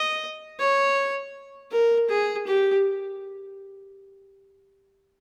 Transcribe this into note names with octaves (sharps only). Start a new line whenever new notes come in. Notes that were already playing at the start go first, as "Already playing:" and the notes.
Already playing: D#5
C#5
A#4
G#4
G4